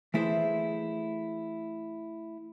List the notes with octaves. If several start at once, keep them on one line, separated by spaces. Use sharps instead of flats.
E3 A3 E4 G#4 B4 C5